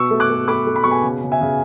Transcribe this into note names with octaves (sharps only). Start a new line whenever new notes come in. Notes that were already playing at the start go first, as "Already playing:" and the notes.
Already playing: B2 C#6 E6
A3
D6 F#6
A3
A3 B5 D6
A3
B5
B2 C#6
G#5 B5
C#3
C#3
E5 G#5
C#3